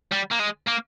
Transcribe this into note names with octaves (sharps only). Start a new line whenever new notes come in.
G3
A#3
G#3
A#3